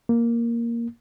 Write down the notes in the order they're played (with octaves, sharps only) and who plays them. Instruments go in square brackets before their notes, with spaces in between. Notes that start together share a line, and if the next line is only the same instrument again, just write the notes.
[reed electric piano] A#3